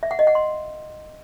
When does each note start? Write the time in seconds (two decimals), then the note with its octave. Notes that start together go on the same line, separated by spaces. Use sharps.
0.03 E5
0.11 F#5
0.19 D#5
0.27 F#5
0.35 C6